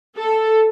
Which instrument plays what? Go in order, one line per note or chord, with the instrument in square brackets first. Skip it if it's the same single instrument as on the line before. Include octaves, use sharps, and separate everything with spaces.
[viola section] A4